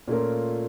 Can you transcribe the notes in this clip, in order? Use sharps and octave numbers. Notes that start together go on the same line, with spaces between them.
A#2 A3 C#4 F4 A#4